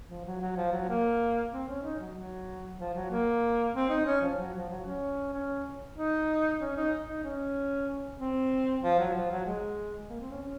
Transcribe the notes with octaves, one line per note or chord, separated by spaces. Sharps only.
F3
F#3
F#3
F3
F#3
A#3
C4
C#4
D#4
F#3
F#3
F3
F#3
A#3
C4
D#4
C#4
F3
F#3
F3
F#3
C#4
C#4
D#4
C#4
D#4
D#4
C#4
C4
F3
F#3
F3
F#3
G#3
A#3
C4
C#4
C#4